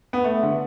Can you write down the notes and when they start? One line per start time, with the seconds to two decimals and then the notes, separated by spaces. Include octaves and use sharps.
0.13 B3
0.24 A3
0.43 D3